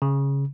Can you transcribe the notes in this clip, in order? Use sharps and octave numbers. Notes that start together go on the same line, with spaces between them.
C#3